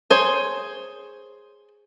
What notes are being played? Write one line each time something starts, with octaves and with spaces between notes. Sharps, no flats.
G#4 C5 C#5